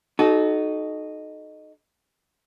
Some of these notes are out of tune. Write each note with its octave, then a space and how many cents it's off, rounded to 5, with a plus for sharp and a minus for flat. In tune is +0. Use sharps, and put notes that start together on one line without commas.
D#4 -10 F#4 +15 A4 -30